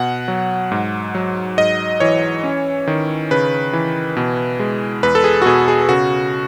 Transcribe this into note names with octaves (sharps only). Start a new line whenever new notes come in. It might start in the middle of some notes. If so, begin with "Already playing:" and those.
Already playing: B2 F#5
F#3
G#2
F#3
G#2 D#5
E3 C#5
C#4
D#3
C#3 B4
E3
B2
G#3
E2 B4
A4
G#4
F#4
B2 G#4
G#4
C#3 F#4